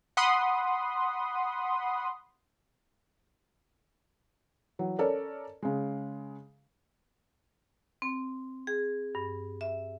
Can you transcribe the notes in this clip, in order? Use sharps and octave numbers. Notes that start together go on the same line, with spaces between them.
F#5 B5 C6 D#6
E3 F#3
C#4 A4 A#4 C#5 D5
C#3 G#3
C4
G#4
G2
E5